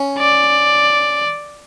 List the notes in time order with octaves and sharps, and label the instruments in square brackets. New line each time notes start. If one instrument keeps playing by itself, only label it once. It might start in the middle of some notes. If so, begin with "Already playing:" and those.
Already playing: [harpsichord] C#4
[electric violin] D5